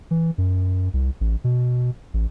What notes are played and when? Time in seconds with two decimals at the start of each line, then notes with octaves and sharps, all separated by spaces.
0.11 E3
0.38 F#2
0.94 C2
1.21 A1
1.44 B2
2.14 A1